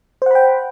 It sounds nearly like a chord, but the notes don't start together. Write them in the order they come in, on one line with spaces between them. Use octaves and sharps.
C5 F#5 B5 G5